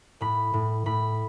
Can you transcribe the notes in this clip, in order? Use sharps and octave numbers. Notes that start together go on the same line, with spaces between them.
A2 B5
A2
A2 B5